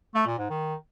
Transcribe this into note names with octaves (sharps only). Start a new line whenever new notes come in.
A3
A#2
G#2
D#3